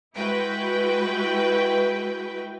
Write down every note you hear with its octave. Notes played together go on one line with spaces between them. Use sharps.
G#3 E4 F#4 B4 G5